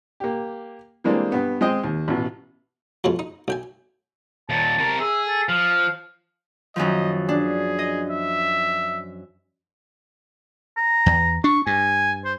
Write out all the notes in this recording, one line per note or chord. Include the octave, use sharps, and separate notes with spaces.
A#3 G4
E3 G3 G#3 A#3 C4 D4
G2 B3
G#3 C4 D#5 G5
D#2
A1 B2
F2 B2 F3 G#3
D#4
B1 G5 G#5
D#2 A#2 A5
C3 A#4
G#4 E5
A4
F3 F5
F#2 D#3 F3 D#5
D4 G#4
D#5
E5
A#5
E2
D4 C#6
G2 G#5
C5